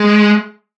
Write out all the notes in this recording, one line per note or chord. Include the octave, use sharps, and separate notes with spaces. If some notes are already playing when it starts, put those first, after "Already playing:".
Already playing: G#3